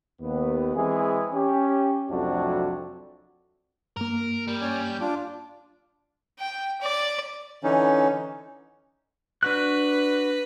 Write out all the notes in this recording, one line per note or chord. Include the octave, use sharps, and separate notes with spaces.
D#2 B3
E3 G#3 C4 G#4
C#4 G4
C2 F2 F#3 A3 D4 F#4
G2 A#3 A#4
G3
C#4 D5 G#5
G6
D4 F4 D6
G5
D5
D3 E3 C#4 D#4
D4 F#4 B4 F#6